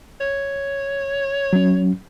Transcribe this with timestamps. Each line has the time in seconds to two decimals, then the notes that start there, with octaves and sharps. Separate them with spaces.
0.21 C#5
1.53 F#3 C#4